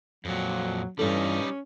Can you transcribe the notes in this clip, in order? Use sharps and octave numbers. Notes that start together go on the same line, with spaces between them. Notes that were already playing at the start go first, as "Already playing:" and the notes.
F2 A#2 F#3
G2 E3 G3 C#4 D#4 A4